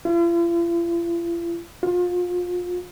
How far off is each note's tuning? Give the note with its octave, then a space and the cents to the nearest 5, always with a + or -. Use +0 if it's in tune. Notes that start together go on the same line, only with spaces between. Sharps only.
F4 -45
F4 +30